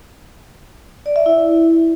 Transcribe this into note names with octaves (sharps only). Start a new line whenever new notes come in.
D5
E5
E4